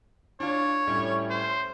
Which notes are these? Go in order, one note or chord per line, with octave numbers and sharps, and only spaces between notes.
D4 F4 C#5
A2 G3 C#4
C5